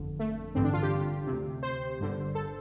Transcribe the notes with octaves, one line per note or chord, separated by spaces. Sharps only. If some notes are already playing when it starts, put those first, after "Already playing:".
Already playing: G1 F2 D3
A3
A1 G2 D3 C4
D4
F4
G4
C3
D2
C5
G1 G2 D3
A4